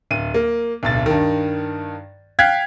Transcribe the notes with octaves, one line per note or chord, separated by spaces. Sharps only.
D1 D#7
A#3
D1 B1 A6
G2 D#3
F5 G5 F#6 G#6 B6